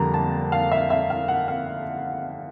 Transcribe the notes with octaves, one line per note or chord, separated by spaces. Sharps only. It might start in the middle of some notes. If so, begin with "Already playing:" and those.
Already playing: F2 D3 G3 A#3 A#5
A5
F5
E5
E5
F5
F#5
F5